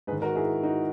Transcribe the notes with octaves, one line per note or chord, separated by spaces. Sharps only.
G#2 D#3 G#4 B4
F#4 A#4
E4 G#4
D#4 F#4